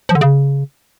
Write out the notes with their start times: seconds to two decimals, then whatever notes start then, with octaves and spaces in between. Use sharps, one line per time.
0.09 F3
0.15 D3
0.21 C#3